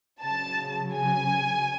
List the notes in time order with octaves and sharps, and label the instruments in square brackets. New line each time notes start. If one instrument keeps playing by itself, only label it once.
[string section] C#3 F#3 A5
G#5